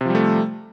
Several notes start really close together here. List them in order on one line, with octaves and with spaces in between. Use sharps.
C3 F3 G3 A3